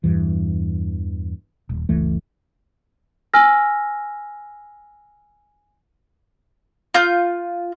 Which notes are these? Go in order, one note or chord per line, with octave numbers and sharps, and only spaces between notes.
E2 G2 E3
D#1
F#1 C#2 E3 A3
G#5 E6 F6 A#6
F4 G6